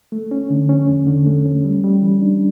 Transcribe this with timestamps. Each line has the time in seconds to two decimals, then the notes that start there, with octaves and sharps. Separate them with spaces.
0.12 A3
0.31 C#4
0.50 D3
0.69 C#4
0.88 E2
1.07 D3
1.26 A3
1.45 C#4
1.64 G3
1.84 G3
2.02 E3
2.22 D4